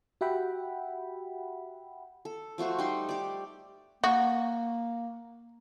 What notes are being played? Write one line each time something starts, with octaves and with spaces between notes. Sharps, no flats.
F#4 G4 E5 F#5 G5 B5
A4
F3 A3 F#4 C5
G3 D#4 C6
G4 D5
A#3 F#4